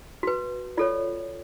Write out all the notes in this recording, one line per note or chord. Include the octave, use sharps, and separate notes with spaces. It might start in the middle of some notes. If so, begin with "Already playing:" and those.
F#4 B4
F4 A4 C#5 D5